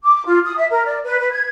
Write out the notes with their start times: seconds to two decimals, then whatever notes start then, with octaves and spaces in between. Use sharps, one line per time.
0.03 D6
0.25 F4
0.44 D#6
0.56 E5
0.71 A#4
0.85 D5
1.04 B4
1.19 B4
1.30 G#6